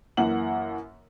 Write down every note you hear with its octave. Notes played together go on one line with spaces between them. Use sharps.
F#2 E3 A#3 F#5 F#7